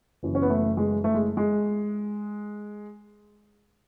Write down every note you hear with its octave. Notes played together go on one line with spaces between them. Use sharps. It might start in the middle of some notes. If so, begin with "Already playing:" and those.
F#1 F#2 E3
C#4
B3
A3
G#3
A3
G#3
G#3